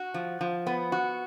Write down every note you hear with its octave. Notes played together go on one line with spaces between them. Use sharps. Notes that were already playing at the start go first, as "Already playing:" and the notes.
Already playing: F#4
F3
F3
B3
F#4